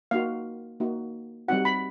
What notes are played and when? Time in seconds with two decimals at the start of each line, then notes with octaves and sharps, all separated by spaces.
0.11 A#3 D#4 F#4 F5
0.80 A#3 D#4 F#4
1.48 G3 C4 D#4 F#4 F#5
1.65 B5